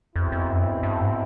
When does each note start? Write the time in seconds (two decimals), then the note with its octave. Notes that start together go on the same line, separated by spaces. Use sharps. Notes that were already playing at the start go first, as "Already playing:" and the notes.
0.15 F2 B2 G#3 C4 E4
0.32 F2
0.49 F#2
0.66 G2
0.83 G2
1.00 G#2